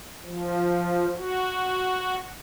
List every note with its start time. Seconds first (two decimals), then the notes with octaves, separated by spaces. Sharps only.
0.25 F3
1.17 F#4